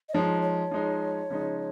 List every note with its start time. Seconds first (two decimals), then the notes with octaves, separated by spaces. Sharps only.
0.09 D#5
0.13 F3 G#3 D#4 C#5
0.42 C#5
0.71 F3 G#3 D#4
1.30 C#3 F3 G#3 D#4